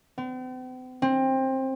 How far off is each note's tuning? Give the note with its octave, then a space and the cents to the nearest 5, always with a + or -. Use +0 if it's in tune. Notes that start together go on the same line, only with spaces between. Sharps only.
C4 -45
C4 +20